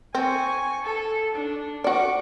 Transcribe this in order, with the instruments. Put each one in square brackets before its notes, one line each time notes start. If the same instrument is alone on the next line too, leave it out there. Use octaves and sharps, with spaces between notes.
[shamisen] C4 [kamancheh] G#5 C#6
[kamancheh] A4
D4
[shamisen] F#4 D5 [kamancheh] C#6 D6